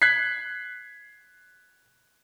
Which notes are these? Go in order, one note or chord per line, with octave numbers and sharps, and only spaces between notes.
F#6 G#6 B6 C7